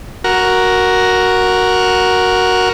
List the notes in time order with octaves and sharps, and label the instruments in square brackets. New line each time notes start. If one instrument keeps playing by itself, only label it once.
[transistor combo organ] F#4 A#4